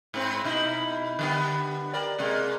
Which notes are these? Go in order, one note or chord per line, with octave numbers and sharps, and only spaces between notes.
G#2 C4 B4
B2 D#4 E4
D3 G3 B3
G4 A#4 D5
C3 G#3 A#3